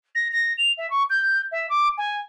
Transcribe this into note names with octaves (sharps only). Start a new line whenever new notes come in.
A#6
A#6
F7
E5
C#6
G6
E5
D6
G#5